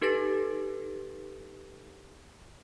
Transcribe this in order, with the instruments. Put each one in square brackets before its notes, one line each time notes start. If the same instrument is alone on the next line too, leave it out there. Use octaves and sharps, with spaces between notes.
[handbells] D#4 G4 A4 B4 A6 A#6